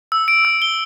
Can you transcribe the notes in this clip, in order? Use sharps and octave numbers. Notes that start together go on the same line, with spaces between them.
E6
D7
E6
G7